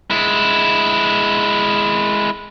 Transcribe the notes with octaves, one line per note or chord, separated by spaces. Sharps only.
G#3 E4